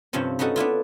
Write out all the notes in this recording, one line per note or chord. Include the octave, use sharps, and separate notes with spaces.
G2 C3 F3 C4 C#4
B3 C#4 D#4 F#4 A4
B3 D4 E4 F4